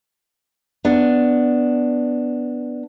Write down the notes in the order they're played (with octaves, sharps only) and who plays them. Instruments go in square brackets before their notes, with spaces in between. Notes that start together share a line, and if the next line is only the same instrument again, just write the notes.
[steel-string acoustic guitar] B3 D4